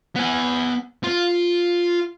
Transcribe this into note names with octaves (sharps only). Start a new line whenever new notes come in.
B3 G#5
F4